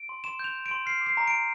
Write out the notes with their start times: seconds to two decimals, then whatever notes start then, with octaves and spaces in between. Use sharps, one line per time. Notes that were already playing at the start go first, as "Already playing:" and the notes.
Already playing: D7
0.09 C6
0.24 C6 E7
0.39 G6 F7
0.55 G6
0.66 D7
0.71 C6
0.86 F6 C7
1.01 D6
1.06 C7
1.17 A#5
1.28 A#5 D7